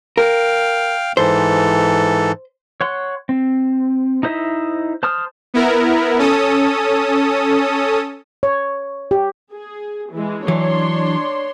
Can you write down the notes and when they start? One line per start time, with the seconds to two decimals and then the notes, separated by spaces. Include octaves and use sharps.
0.17 A#4 F5 G5
1.17 G#2 E3 A4 C5
2.81 C#5 F#5 C6
3.29 C4
4.23 D#4 E4 C5 D#5 E5
5.03 C5 A5 C6 D#6 F6
5.54 B3 E4 A#4
6.18 C#4 A4 D#6
8.43 C#5
9.11 G4
9.53 G#4
10.12 E3 G#3
10.48 E3 F#3 D4 C#5 C6